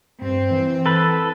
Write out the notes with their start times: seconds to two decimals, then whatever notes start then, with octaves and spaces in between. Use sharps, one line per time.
0.22 G2 C4
0.51 E3
0.86 A4 B4